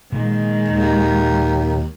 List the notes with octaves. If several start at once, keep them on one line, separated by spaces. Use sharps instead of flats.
A#2 D#3 G#3 A#3
D#2